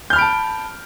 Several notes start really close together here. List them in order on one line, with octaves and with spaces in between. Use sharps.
G6 F6 B5 D7 A5